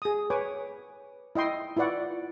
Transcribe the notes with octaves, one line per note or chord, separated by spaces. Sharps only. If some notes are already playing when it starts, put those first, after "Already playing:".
G#4 D#6
B4 C#5 G#5 D6
E4 D#5 G5 C6
E4 F4 B4 D5 F#5 C#6